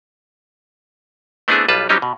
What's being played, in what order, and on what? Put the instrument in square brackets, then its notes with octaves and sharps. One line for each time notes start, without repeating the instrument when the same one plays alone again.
[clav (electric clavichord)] A3 B3 C4 D4 E4 G#4
B1 G3 F4 B4 A5
F#3 G3 C4 C#4 D#4 G4
B2